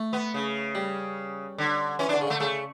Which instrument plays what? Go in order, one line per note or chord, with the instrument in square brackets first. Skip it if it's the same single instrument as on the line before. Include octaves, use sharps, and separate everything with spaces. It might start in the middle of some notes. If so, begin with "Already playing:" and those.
Already playing: [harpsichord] A3
[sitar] B3
C#3
[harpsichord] G3
[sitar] D3
[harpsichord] E3 [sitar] C#4
[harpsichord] D3 [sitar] D4
[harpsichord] C#3
[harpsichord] D3 [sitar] A3
[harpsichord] C#3 [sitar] A3